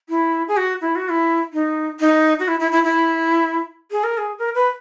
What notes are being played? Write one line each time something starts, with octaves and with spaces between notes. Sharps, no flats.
E4
G#4
F#4
E4
F#4
E4
D#4
D#4
F#4
E4
E4
E4
E4
G#4
A#4
G#4
A#4
B4